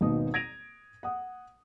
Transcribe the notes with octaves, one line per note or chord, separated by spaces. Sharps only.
G#1 D#2 B2 B3 D#4 D#6
G#6 A#6 D7 D#7 F7
F#5 D#6